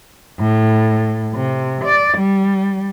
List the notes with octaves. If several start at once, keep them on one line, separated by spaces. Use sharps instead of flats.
A2
C3
D5
G3